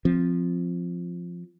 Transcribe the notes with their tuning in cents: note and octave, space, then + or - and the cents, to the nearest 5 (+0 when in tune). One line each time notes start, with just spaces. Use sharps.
F3 +0 C4 +0